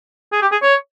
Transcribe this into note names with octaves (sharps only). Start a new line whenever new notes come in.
G#4
G4
G#4
C#5